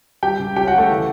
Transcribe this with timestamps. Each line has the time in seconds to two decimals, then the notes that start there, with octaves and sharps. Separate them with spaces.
0.23 G3 G4 G5
0.39 C#2
0.56 C#4 G4 G5
0.67 F#4 F#5
0.73 C#3
0.78 A3 A4
0.90 E3